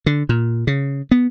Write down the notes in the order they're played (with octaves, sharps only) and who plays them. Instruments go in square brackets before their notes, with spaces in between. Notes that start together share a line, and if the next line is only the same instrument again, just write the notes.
[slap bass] D3
A#2
C#3
B3